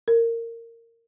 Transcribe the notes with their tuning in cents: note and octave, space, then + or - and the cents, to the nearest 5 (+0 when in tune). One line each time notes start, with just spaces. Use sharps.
A#4 -20